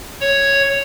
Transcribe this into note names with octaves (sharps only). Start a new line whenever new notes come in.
C#5